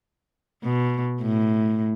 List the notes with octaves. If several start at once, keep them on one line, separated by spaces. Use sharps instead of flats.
B2
A2